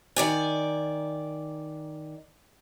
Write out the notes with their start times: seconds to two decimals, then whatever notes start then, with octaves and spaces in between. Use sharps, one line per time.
0.16 D#3 D5 G#5